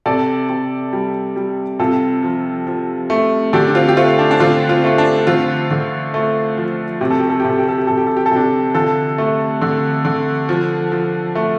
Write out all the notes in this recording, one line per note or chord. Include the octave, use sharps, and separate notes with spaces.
C3 A4 D5
C3
G3
G3
C3 F4 A4
F3
F3
A3
D3 D4 G4
D4
C4 F4
G4
A3 C4 F4
D4
D4
D3 C4 F4
C4 F4
A3 F4
D4
D3 C4 F4
D3
A3
F3
C3 G4
A4
G4
A4
G4
C3 A4
G4
A4
G4
C3 A4
G4
A4
G4
A4
C3 D4 G4
D3 F4 A4
A3
D3
D3
F3
F3
A3